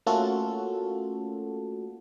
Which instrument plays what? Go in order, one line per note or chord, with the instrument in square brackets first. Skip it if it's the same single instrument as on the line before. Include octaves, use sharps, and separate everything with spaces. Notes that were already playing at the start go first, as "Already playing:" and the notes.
[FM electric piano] A3 A#3 C#4 F4 F#4 A4